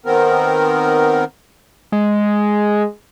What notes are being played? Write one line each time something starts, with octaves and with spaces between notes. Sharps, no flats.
D#3 B3 C4 A#4
G#3